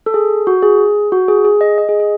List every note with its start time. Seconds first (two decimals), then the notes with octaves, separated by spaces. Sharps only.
0.06 A4
0.14 G#4
0.47 F#4
0.62 G#4
1.12 F#4
1.28 G#4
1.45 G#4
1.61 D#5
1.78 D#5
1.89 G#4
2.00 G#4